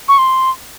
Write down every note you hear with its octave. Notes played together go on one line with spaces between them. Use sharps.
C#6
C6